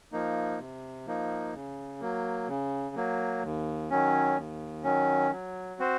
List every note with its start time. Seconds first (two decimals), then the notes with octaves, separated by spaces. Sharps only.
0.12 F3 A#3 D#4
0.59 C3
1.06 F3 A#3 D#4
1.54 C#3
2.01 F#3 A#3
2.48 C#3
2.96 F#3 A#3
3.43 D#2
3.90 D#3 F#3 C#4
4.37 D#2
4.84 D#3 F#3 C#4
5.31 F#3
5.79 C4 F#4 C5